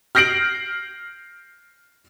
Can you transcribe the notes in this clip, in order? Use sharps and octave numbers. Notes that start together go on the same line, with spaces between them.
F6 G6 A#6 C7 D7 F#7